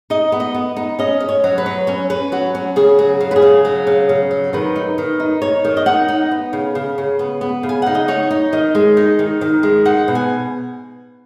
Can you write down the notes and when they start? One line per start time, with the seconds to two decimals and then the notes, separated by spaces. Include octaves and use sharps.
0.10 D#4 D#5
0.32 B3
0.40 D#5
0.54 B3
0.76 D#4
0.99 C#4 D#5
1.20 C#4
1.29 C#5
1.44 F#3
1.58 B4
1.66 F#3
1.87 C#4 C#5
2.10 C#4 B4
2.32 F#3 F#4
2.55 C#4
2.76 C#3 G#4
2.99 F#3
3.20 C#3
3.31 B4
3.36 G#4
3.42 C#3
3.65 F#3
3.87 C#3
4.09 C#3
4.31 F#3
4.53 D#3 B4
4.76 D#4
4.98 D#3
5.20 D#4
5.42 D#4 C#5
5.65 D#3
5.77 D#5
5.86 D#4 F#5
6.08 D#4
6.31 B3
6.53 C#3
6.75 C#3
6.98 C#3
7.19 B3
7.41 B3
7.63 C#3
7.69 G#5
7.82 D#4 F#5
7.95 D#5
8.08 D#4 C#5
8.31 D#4
8.53 D#3 D#5
8.75 G#3
8.97 D#4
9.19 D#3
9.41 D#3
9.63 G#3
9.85 D#4 F#5
10.08 B2
10.15 G#5